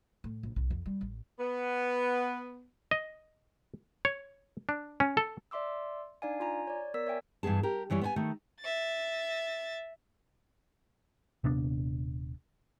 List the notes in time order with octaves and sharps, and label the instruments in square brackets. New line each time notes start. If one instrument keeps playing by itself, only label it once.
[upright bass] A2
A#1
B1
F2
G3
A1
[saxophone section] B3
[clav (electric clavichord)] D#5
C#5
D4
C#4
A4
[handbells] D5 E5 C6 D6 E6
D4 D#4 D5 F5 G#5
F4 G#5 A#5
C#5 D5
B3 A#4 D5 E6 B6
C#5 E5 G5 G#5
[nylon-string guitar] G2 E3 B3 G#4 A5
G4 A#4
F#2 E3 G3 C#5
B3 C5 G#5
D#3 A3
[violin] E5 A6
[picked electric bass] D#1 C3 B3 D4